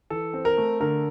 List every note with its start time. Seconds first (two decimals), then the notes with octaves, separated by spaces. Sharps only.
0.10 E3 A4
0.34 C4
0.45 A#4
0.57 A3
0.80 D3 A#4